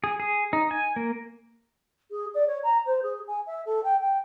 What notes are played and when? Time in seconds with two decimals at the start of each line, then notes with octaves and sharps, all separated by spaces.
0.04 G#4
0.20 G#4
0.53 D#4
0.71 G#5
0.96 A#3
2.11 G#4
2.35 D5
2.47 C#5
2.63 A#5
2.86 C5
3.03 G#4
3.28 G#5
3.47 E5
3.66 A4
3.84 G5
4.01 G5